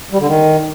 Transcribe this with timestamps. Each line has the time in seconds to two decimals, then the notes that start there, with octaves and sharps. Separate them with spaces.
0.13 G3
0.20 D3
0.27 D#3